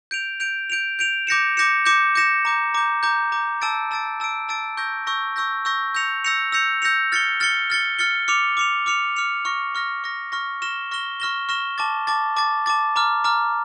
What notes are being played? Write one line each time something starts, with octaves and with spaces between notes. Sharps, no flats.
G6 D7 F7
G6 D7 F7
G6 D7 F7
G6 D7 F7
D6 G6 A#6 C#7 E7
D6 G6 A#6 C#7 E7
D6 G6 A#6 C#7 E7
D6 G6 A#6 C#7 E7
A#5 D6 G6
A#5 D6 G6
A#5 D6 G6
A#5 D6 G6
A5 E6 A6 D7
A5 E6 A6 D7
A5 E6 A6 D7
A5 E6 A6 D7
C#6 E6 G6 A#6
C#6 E6 G6 A#6
C#6 E6 G6 A#6
C#6 E6 G6 A#6
E6 G6 A#6 C#7 F7
E6 G6 A#6 C#7 F7
E6 G6 A#6 C#7 F7
E6 G6 A#6 C#7 F7
F6 A6 C#7 G7
F6 A6 C#7 G7
F6 A6 C#7 G7
F6 A6 C#7 G7
D6 F6 C#7 F7
D6 F6 C#7 F7
D6 F6 C#7 F7
D6 F6 C#7 F7
C#6 F6 A#6
C#6 F6 A#6
C#6 F6 A#6
C#6 F6 A#6
C#6 F6 A#6 E7 G7
C#6 F6 A#6 E7 G7
C#6 F6 A#6 E7 G7
C#6 F6 A#6 E7 G7
A5 D6 A6
A5 D6 A6
A5 D6 A6
A5 D6 A6
A#5 D6 F6
A#5 D6 F6